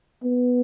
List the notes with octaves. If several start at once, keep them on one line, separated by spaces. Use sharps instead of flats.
B3